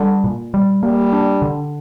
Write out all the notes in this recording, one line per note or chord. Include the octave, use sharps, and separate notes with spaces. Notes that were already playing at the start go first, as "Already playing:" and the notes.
Already playing: D3 G3
A#2
G3
G3 A#3
D4
D3